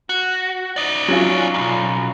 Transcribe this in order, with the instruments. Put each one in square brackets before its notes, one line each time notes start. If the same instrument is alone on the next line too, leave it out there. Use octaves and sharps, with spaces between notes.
[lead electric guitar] F#4
D#4 D5
[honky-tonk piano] F#3 C#4 F4
[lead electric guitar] B1 E2